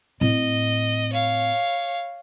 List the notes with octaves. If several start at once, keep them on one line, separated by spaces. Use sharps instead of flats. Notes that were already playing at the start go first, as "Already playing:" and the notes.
A2 C4 D#5
C#5 F5